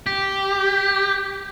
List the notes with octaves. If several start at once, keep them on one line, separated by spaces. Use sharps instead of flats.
G4